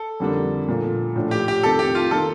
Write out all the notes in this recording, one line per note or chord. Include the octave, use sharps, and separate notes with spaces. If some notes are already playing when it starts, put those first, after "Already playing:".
Already playing: A4
F2 D3 G3 A#3 D4
A#2 F3 A3
A2 F3 A3 D4
G4
G4
F2 C3 D#3 A4
G4
F4
D#3 A#3 F4 A4